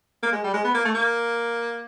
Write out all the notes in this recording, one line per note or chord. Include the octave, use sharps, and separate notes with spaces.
A#3
G#3
G3
G#3
B3
A#3
A3
A#3